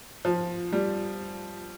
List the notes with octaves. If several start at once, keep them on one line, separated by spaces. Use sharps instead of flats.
F3
G3